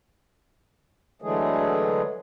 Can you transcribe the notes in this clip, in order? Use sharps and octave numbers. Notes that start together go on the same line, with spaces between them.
D3 E3 F#3 G#3 A3 G#4